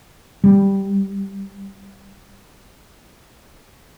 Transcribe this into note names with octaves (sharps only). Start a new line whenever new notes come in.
G3